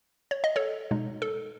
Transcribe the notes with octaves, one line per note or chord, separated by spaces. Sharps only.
C#5
D#5
A4 C#5
B2 G#3 D#4
A4